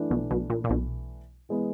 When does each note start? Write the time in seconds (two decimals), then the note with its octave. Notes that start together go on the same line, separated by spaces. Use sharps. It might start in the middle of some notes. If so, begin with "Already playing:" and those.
Already playing: E3 A3 D4
0.10 B1 B2
0.31 B1 B2
0.50 A#2
0.64 A#2
0.70 B1 B2
1.49 E3 G#3 B3